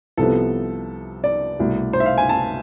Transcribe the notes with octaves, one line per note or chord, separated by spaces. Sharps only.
C2 C3 F3 B3 A4
D5
C2 B2 A3
C5
E5
F5
G#5
A5